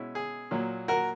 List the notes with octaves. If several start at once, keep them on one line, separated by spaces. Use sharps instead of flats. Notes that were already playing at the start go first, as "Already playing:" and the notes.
Already playing: B2 G#3 C#4 E4
G#4
A#2 F#3 A#3
F#4 A#4